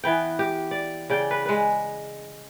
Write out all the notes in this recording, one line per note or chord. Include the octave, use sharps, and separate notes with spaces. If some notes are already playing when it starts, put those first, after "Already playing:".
E3 B3 G5
G4
D5
C#3 D5 G5
B4
G#3 B4